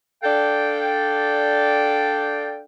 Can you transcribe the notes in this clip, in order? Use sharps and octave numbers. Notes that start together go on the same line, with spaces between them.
D4 A4 D5 F5 G5